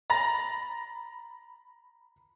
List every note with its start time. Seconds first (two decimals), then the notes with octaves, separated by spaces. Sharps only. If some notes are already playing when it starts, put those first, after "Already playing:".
0.10 A#5 B5 A6 A#6